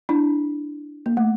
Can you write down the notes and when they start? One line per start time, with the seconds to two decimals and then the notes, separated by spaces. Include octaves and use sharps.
0.09 D4 E4
1.06 A#3
1.17 A3